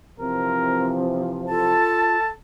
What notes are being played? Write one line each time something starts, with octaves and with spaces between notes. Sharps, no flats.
C3 E3 F3 C4 A#4
F4 A4 A5